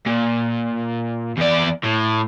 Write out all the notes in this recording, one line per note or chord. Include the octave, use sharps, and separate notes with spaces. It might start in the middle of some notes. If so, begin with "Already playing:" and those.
A#2
E2 D5
A2